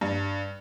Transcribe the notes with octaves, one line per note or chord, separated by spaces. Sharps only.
G2